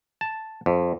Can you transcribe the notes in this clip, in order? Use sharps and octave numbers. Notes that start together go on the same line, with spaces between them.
A5
F2